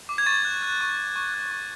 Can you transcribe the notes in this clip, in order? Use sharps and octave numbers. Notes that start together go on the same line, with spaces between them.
D6
G#6
C#6 A6
F#6
F#6
C#6
C#6
C#6
F#6
C#6